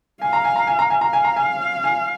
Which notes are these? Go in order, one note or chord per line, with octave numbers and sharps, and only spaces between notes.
F5 G#5
A#5
G#5
A#5
G#5
A#5
G#5
F5 A#5
G#5
A#5
G#5
G#5